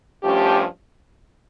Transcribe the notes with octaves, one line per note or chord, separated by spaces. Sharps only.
G2 F3 A3 C#4 G4